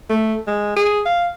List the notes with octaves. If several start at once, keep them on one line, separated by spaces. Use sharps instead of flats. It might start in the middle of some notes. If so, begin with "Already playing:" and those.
A3
G#3
G#4
F5